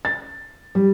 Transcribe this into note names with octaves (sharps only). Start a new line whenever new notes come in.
A6
G3